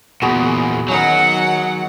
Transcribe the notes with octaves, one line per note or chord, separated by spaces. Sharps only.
E2 A#2 B3 F#4 G#4
D#3 F#3 C#4 D#4 F#5